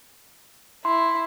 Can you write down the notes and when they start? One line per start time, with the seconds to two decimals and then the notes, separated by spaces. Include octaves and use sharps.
0.85 E4 C6